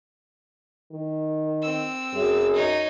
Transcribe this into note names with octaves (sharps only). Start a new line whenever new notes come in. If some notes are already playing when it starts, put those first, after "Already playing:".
D#3
C4 E6
F#2 G#4
D#4 C#5